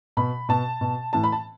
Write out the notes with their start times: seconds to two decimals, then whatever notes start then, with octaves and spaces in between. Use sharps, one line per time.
0.17 B2 B5
0.49 B2 A5
0.81 B2
1.13 A2 E3 A5
1.24 B5
1.32 A5